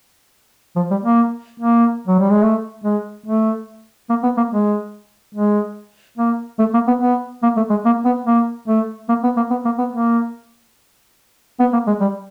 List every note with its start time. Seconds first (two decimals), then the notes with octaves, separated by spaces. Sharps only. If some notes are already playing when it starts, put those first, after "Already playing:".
0.76 F3
0.91 G3
1.04 A#3
1.60 A#3
2.08 F#3
2.19 G3
2.31 G#3
2.43 A3
2.84 G#3
3.26 A3
4.10 A#3
4.23 B3
4.37 A#3
4.51 G#3
5.35 G#3
6.18 A#3
6.59 A3
6.74 A#3
6.87 B3
7.02 B3
7.43 A#3
7.57 A3
7.70 G#3
7.85 A#3
8.05 B3
8.26 A#3
8.68 A3
9.09 A#3
9.24 B3
9.37 A#3
9.51 B3
9.65 A#3
9.78 B3
9.93 A#3
11.60 B3
11.73 A#3
11.87 G#3
12.01 G3